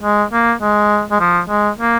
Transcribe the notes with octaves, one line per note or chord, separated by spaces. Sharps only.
G#3
A#3
G#3
G#3
F3
G#3
A#3